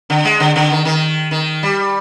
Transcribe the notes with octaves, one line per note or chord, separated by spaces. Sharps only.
D3
G#3
D3
D3
D#3
D#3
D#3
G3